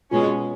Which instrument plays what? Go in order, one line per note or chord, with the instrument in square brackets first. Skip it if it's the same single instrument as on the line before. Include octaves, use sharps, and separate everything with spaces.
[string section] B2 G#3 C#4 [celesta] F4